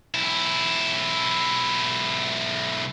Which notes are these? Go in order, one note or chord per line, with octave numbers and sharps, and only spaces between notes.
B1 E4